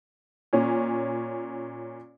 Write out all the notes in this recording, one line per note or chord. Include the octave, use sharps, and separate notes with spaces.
A#2 C#4